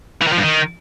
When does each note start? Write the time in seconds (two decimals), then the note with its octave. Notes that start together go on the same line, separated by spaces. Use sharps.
0.22 E3
0.27 D#3
0.32 F3
0.37 G2
0.43 D#3